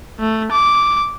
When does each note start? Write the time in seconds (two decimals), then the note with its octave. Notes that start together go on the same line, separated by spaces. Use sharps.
0.20 A3
0.52 D6